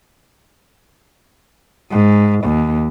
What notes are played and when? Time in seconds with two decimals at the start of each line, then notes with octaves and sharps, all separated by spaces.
1.92 G#2
2.45 D#2